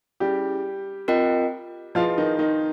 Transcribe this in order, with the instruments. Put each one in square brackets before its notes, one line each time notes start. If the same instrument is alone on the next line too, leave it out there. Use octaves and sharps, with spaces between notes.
[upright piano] G3 G4 [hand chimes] C#4 E4 G#4
[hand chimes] C4 F4 A#4 D#5 G5
[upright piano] F3 F4 [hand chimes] E4 G#4 B4 D#5
[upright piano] D#3 D#4
D#3 D#4